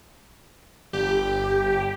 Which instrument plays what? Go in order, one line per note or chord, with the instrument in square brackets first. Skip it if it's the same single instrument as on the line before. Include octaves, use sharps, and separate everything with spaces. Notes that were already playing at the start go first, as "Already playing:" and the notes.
[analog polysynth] G1 G4